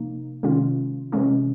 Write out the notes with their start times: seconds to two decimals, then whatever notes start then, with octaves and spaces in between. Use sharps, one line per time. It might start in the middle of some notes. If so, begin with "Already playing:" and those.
Already playing: C3 F3 A#3 D#4
0.43 C3 D#3 G#3 C#4 F4
1.12 C3 E3 G#3 C#4